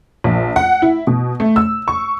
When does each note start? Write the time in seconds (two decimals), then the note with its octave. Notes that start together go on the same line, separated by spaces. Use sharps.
0.24 A#1
0.56 F#5
0.82 E4
1.07 B2
1.40 A3
1.56 E6
1.88 C#6